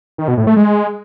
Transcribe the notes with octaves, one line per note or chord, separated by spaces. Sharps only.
D#3
B2
A2
A3
G#3